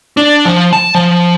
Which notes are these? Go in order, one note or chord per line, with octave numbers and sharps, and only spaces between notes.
D4
F3
A5
F3